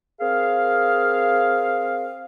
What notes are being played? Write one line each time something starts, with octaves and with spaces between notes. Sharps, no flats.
C4 G#4 A#4 F5